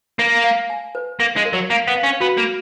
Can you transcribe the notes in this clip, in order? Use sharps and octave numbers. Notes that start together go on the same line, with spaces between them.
A#3 F5
F5
G#5
B4
A#3 F5
G#3
A#4
F#3
A#3 F5
B3
F5
C#4
B3 F#4
A#3